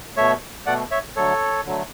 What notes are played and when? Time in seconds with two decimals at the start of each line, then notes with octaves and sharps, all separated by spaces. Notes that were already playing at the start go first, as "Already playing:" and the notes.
0.17 B2 A3 C#5 E5
0.66 B2 A3 D5 F#5
0.91 C#5 E5
1.16 D3 F#3 A3 A4 C#5
1.65 D3 F#3 A3